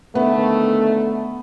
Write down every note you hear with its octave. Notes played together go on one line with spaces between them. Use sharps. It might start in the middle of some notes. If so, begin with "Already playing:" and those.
D3 D#3 A3 B3